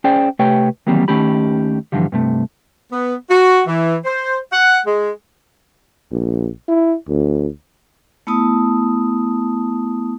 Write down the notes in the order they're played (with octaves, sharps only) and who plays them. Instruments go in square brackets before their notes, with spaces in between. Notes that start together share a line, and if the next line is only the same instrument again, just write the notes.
[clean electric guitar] C#4 G#4 C5 D5 G5
C3 A3 G4 B4 C#5 G5
D#3 E3 F#3 G3 A#3 C4
D#2 D#3 A3 C#4 G4 B5
G2 B2 D3 E3 F3 G3
G2 C3 A3
[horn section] B3
F#4
E3
C5
F#5
G#3
[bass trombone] A#1
E4
D2
[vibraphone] A3 B3 E4 A5 D#6